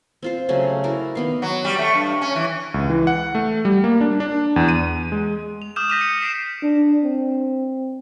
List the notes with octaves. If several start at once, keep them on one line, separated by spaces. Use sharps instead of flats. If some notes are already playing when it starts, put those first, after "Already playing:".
C4 F4 C5
C#3 F#3 A3 C#4
E4 F#4 A#4 D5
D#3 B3 F5
F#3
G3
A3
G2
C#4
E3
C#2
E3
F#5
A3
G3
A#3
D4
D4
E2
D#7
G#3
F7
D6 D#6 F6 G6 E7
G6 A#6 B6 D#7 F7
C#7
B6 C7 D7 E7
D4
C4